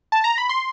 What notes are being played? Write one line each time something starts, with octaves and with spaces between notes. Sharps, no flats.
A5
A#5
B5
C6